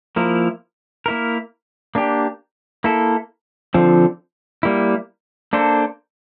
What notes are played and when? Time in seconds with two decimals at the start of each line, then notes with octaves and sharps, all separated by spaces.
0.16 F3 A#3 E4 A#4
1.06 A#3 E4 A#4
1.95 A#3 D4 G4
2.84 A#3 E4 A4
3.74 D3 F3 C4 F4
4.63 G3 A#3 E4
5.53 A#3 D4 A4 C5